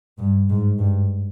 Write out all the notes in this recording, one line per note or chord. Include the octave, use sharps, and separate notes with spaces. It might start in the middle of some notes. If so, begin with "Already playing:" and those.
G2
G#2
G2